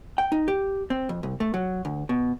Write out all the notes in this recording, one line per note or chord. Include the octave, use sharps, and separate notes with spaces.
G5
D#4
G4
C4
F2
C2
A3
F#3
D2
B2